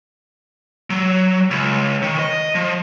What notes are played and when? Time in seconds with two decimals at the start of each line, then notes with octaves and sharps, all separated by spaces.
0.90 F#3
1.51 C#2
2.02 D#3
2.19 D#5
2.55 F3